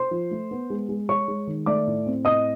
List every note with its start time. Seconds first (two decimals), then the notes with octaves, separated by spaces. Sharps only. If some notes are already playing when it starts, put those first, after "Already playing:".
Already playing: C5 C6
0.11 F3
0.31 A3
0.51 B3
0.70 G#3
0.89 G#3
1.09 G#3 C#5 C#6
1.28 G#3
1.47 D#3
1.66 A3 D5 D6
1.87 A2
2.06 C4
2.25 A2 D#5 D#6